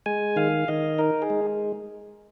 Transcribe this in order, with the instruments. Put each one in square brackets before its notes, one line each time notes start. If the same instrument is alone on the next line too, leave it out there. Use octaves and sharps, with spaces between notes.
[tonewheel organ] G#3 G#5
D#3 F5
D#3 D#5
D#4 A#4
G#4
G#3